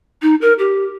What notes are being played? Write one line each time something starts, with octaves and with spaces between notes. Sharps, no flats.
D#4
A#4
G4